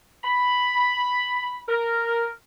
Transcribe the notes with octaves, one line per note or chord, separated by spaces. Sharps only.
B5
A#4